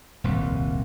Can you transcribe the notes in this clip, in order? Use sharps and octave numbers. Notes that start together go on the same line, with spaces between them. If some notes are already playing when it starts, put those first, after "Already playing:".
D#1 C2 F2